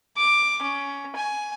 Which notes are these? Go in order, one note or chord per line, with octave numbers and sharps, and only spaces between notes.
D6
C#4
G#5